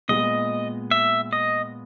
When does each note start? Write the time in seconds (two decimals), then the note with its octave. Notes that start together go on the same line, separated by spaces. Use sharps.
0.09 A#2 G#3 B3 D#5
0.91 E5
1.33 D#5